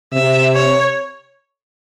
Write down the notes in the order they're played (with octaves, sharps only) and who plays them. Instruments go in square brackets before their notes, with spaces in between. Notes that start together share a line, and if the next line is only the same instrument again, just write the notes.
[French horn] C3 [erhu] E5
[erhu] C#5